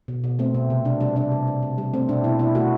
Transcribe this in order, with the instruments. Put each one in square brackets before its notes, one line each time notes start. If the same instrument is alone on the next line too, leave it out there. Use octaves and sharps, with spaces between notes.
[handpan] B2
B2
A3 C4
B2
C3
C3 D4
G3 D4
C3 D4
C3
C3
C3
G3
A3 C4
B2 D4
B2 E4
B2 E4
A3 F#4